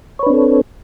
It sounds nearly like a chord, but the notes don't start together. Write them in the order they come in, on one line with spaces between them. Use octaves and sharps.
C#5 B4 D4 C4 A4